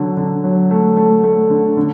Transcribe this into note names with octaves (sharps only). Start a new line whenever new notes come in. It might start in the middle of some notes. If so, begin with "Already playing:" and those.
Already playing: D3 F#3
D3
F#3
A3
A3
A3
D3
D3